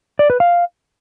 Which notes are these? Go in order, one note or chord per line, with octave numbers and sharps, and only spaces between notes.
D5
B4
F5